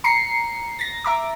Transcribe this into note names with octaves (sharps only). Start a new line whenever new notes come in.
A#5 C7 C#7
A6 A#6
E5 A#5 D6